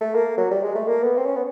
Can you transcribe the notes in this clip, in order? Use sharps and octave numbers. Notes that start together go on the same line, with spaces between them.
A3
A#3
F#3
G3
G#3
A3
A#3
B3
C4
C#4
B3